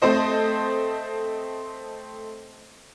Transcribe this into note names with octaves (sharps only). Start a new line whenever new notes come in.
A3 C4 A4 C5 D#5